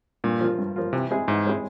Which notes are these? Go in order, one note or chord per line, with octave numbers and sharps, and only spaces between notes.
G2 A#2
F3 A#3 F4
G2
F3 A#3 F4
C3 E3
G#3 C4 E4 G#4
G#2 E3
G#3 C4 E4 G#4